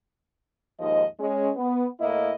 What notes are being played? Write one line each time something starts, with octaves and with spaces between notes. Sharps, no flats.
D#2 G#2 F3 D#5
G#3 C#4
B3
A2 A#3 E4 D#5